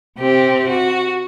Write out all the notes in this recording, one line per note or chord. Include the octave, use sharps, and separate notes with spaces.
C3 C4 G4
F#4